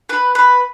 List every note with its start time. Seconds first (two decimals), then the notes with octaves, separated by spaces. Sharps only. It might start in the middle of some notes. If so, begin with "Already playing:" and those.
0.09 B4
0.35 B4